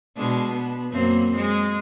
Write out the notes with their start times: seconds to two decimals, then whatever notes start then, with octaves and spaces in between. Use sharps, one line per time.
0.16 B2 G#3 D4
0.53 B3
0.91 F#2 A#3 C4
1.36 G#3